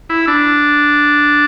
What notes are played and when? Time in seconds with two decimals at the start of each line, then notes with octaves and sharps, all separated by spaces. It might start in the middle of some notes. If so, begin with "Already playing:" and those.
0.10 E4
0.28 D4